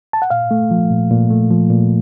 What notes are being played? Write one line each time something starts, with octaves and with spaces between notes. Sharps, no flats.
A5
F#5
A#2 F5
A3
F3
A#2
A#2
A3
F3
A#2